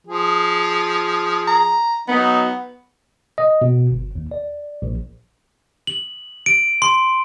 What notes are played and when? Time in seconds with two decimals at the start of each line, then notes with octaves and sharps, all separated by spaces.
0.07 F3 G#4
1.48 A#5
2.08 F#3 B3 D#4
3.38 D#5
3.61 B2
3.91 G1
4.15 D#2
4.31 D5
4.82 A#1
5.87 F#7
6.46 D7
6.82 C6